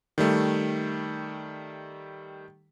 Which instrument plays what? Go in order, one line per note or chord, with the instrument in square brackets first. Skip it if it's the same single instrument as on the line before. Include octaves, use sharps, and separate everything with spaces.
[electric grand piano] D#3 G3 A3